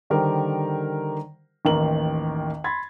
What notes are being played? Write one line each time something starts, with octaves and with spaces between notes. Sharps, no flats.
D3 D#3 G3 G4 A#4 C5
A1 D#2 D#3 A#4 F#7
B5 C6 G#6 A6